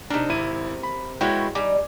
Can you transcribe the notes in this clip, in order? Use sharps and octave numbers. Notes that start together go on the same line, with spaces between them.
C3 D4 D#4 A#4
G#1 E4 D#7
B5
G#3 B3 E4 F#4 C#5 G5
G3 D#4 G#5 D6